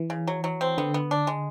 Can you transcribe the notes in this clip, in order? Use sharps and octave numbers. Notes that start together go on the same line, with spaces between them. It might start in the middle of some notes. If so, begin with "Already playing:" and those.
Already playing: E3
C#3
F#3
F#3
C4
D3 B3
B3
D4
G#3